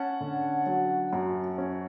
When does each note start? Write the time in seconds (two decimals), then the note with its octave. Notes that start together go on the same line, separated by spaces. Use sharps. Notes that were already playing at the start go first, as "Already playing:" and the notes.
Already playing: C#4 F#5 A5
0.21 D3
0.66 F#3
1.13 F#2
1.58 C#4